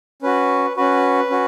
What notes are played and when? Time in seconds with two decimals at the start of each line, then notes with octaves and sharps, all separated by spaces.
0.22 C#4 F#4 B4
0.77 C#4 F#4 B4
1.30 C#4 F#4